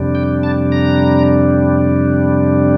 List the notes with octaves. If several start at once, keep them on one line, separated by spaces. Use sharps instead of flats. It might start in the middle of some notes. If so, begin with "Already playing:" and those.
Already playing: F2 C3 G3 D4
G5
A5
A#5